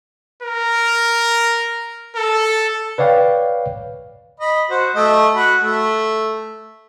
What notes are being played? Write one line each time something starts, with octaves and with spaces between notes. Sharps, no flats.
A#4
A4
B4 C#5 D5 F5 G5
D#5 B5
F#4 C5
A3 D#5
F#4 B5
A3